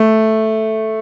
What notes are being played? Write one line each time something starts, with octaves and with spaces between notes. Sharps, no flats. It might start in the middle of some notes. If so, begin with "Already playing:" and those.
Already playing: A3